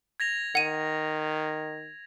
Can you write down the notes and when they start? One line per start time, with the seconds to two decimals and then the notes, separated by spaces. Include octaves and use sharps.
0.20 G#6 A#6 F7
0.55 D#3 F#5 D#7